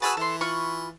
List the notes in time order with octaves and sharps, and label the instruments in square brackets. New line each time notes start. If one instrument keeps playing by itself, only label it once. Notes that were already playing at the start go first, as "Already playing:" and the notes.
[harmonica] F#4 G#4 B4 [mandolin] A5 B5 E6
[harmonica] E3 [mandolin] A4 C6
[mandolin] F4 B5 C#6